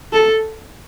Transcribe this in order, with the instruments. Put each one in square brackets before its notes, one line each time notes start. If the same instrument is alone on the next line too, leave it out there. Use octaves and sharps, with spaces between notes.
[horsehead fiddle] A4